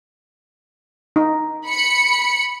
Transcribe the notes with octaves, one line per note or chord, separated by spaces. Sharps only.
D#4
B5 C#7